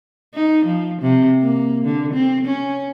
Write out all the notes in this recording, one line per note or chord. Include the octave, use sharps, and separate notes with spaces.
D#4
F3
C3
A#3
D3
C4
C#4